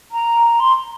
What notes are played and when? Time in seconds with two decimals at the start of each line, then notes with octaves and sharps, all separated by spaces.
0.11 A#5
0.60 C6